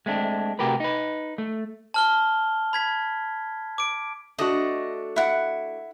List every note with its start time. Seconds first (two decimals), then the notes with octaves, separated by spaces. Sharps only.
0.06 G#3 A3 C4 D4
0.59 C3 A3 F#4 G4 A#4 B4
0.80 D#4 B4
1.38 A3
1.94 A5 F6 G7
2.73 B5 G#6 B6
3.78 D6 D7
4.38 A3 D4 F#4 D#5
5.16 E4 F#5